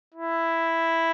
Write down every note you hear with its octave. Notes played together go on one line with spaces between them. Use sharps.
E4